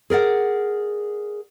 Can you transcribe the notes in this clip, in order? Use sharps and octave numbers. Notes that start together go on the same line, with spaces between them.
G#4 A#4 D5 F#5